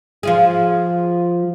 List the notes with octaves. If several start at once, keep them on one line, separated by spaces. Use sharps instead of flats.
F3 F4 G#4